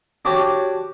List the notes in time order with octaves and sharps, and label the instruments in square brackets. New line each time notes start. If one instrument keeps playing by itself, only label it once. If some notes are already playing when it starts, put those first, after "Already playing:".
[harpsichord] D4 F#4 G4 C#5